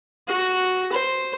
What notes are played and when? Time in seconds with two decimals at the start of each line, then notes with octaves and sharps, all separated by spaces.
0.28 F#4
0.93 C5